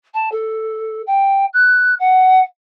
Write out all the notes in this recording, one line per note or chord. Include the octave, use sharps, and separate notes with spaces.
A5
A4
G5
F#6
F#5